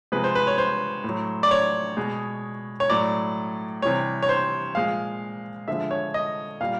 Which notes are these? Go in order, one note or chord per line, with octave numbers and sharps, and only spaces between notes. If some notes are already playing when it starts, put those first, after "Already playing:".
C3 F3 G#3 B4
C5
B4
C#5
C5
A2 F#3
D5
C#5
B2 G#3
C#5
A2 F#3 D5
C3 E3 G3 C#5
C#5
C5
A#2 F3 G#3 F5
D3 F3 G#3 E5
C#5
D#5
A#2 G3 F5